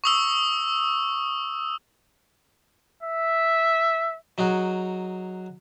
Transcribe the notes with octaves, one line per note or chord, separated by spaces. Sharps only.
C#6 D#6 E6
E5
F#3 D#4 F#4 G#4